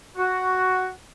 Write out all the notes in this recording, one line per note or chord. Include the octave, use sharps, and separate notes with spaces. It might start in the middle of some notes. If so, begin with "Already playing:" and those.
F#4